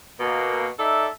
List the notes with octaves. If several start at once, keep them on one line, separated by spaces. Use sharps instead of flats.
B2 A#3
D#4 A4 D5 E5